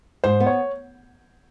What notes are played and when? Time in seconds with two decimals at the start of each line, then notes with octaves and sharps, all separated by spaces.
0.24 G#2 C5
0.40 B3
0.46 C#5